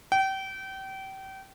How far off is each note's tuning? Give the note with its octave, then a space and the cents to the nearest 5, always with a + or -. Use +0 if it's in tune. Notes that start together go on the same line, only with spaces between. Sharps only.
G5 -30